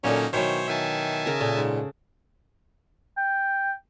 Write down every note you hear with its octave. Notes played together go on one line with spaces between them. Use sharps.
A#2 D3 F#3 A#3 C#4 D#4
B2 D#3 E3 F#3 C5 C#5
D#3 E5 G#5 A5
C#3 A#4
A#2 A4
G#2
G5